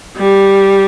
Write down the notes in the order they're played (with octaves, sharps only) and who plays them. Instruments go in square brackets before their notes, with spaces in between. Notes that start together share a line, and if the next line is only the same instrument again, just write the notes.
[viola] G3